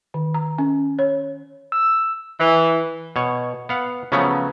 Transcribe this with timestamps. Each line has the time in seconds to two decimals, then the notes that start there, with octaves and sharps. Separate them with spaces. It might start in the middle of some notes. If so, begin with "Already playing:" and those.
0.14 D#3
0.34 A#5
0.59 C#4
0.99 C#5
1.72 E6
2.39 E3
3.16 B2 C#5
3.69 B3 F5 F#5
4.12 C#3 F3 F#3 A3 B3 C#4